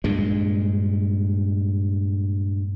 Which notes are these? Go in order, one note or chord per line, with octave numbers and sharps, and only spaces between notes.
G2 A#2 G#3